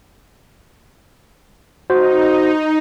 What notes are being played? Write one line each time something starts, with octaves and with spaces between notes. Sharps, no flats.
D#4 F#4 C5